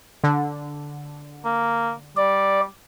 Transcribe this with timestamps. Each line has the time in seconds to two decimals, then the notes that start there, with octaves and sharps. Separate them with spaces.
0.23 D3
1.45 A#3
2.17 G3 D5